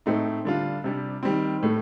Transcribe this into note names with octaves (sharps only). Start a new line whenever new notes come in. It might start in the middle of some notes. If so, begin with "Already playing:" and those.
A2 A3 C4 D#4
D3 G3 D4 F4
C3 G3 D4
D#3 G3 C4
A2 A3